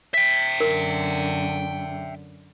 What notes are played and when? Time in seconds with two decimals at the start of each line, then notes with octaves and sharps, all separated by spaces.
0.14 E5 G5 B6
0.60 F#2 D3 A#4